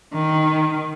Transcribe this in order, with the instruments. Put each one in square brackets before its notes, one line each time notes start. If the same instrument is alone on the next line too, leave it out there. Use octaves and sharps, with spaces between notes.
[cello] D#3